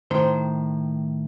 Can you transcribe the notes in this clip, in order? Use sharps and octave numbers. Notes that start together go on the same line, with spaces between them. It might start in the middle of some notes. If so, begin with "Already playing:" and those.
A2 D#3 C5